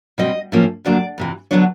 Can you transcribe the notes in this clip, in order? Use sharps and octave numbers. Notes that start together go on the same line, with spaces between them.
B2 G3 C4 D#5
A2 F3 A#3 C#4
F2 D3 F#3 A#3 D4 D5
F2 C3 E3
D3 F#3 B3 D4 C#5